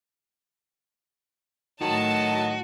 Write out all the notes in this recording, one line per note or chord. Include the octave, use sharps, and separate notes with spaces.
A2 D#3 F#3 F#4 D#5 A5